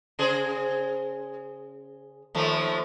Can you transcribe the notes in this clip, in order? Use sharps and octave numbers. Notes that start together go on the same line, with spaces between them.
C#3 G#4 C5
D#2 F3 A3